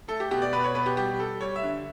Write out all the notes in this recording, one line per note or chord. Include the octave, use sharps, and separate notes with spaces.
A3 A4
G4
B2 G4
D5
B2 B4
C#5
B2 B4
G4
G3 G4
G3 A4
G3 C#5
E5
D3